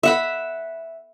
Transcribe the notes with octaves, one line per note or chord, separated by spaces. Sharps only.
E5 F#5 B5